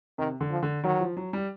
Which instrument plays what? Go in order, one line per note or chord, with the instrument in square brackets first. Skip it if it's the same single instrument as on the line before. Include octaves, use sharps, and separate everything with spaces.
[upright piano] C3 [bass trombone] D#3
[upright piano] D3
[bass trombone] F3
[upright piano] D3
[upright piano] D#3 [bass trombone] F#3
[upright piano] F3
F#3
G3